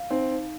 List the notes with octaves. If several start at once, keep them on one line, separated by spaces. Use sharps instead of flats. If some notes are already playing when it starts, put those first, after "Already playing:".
Already playing: F5
C4 D#4
D#4